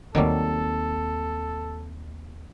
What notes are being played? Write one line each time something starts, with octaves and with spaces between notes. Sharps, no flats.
D#2 D#3 F#3 G3 C4 A4